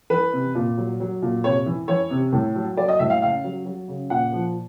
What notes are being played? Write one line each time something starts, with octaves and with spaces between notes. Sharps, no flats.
E3 B4
C3
A#2
F#3
F#3
A#2
C3 C#5
E3
E3 C#5
C3
A2
F#3
F#3 D5
D#5
A2 E5
F5
C#3 F5
F#3
F#3
C#3
A#2 F#5
F3